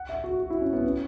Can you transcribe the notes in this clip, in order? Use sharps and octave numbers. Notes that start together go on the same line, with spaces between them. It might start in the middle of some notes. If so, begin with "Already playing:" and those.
Already playing: F#5
E5
F#4
F#4
E4
C#4
B3
C#4